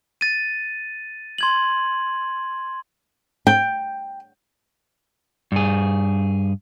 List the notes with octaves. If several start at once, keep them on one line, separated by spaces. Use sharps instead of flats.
A6 D#7
C6 G#6 F#7
G5
G2 G#4